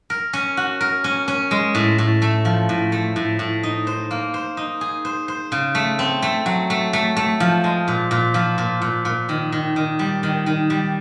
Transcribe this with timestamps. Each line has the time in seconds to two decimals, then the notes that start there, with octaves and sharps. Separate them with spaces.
0.10 A#4
0.33 C#4
0.57 F#4
0.81 A#4
1.04 C#4
1.28 C#4
1.51 G#3
1.75 A2
1.98 A2
2.22 A3
2.45 F3
2.69 A2
2.92 A3
3.16 A2
3.39 A2
3.63 D#4
3.87 C5
4.11 A#3
4.34 C5
4.57 D#4
4.81 G#4
5.05 C5
5.28 C5
5.52 C#3
5.75 A3
5.99 C4
6.22 A3
6.46 F#3
6.70 A3
6.93 A3
7.17 A3
7.40 F3
7.64 G#3
7.88 A#2
8.11 A#2
8.34 F3
8.58 A#2
8.82 A#2
9.05 A#2
9.29 D#3
9.52 D#3
9.76 D#3
9.99 G3
10.23 D#3
10.46 D#3
10.70 G3